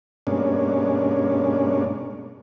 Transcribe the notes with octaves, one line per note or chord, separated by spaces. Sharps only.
G2 B2 G#3 A#3 C#4 D4